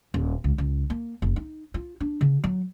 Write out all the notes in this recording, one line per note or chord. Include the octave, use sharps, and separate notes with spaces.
D#1
C#2
C#2
A#3
F1
D#4
F4
D4
C#3
F#3